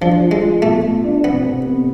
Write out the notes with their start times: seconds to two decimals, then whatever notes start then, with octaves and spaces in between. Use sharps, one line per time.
0.01 F3 D4
0.21 F4
0.31 G#3
0.42 F4
0.62 B2 A3
0.84 F4
1.04 D4
1.24 C3 B3
1.45 C3
1.66 B3